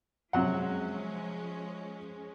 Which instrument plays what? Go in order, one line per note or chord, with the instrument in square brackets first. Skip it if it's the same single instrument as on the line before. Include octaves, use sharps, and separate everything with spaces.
[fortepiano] C3 F#3 F#5 [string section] F3 G#3 C#4